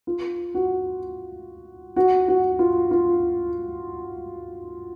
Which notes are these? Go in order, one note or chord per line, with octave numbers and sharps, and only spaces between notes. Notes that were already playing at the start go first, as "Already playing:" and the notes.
F4
F#4
F#4
F#4
F4
F4